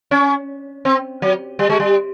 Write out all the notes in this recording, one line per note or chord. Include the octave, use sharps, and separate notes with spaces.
C#4
C4
F#3
G3
G#3
G3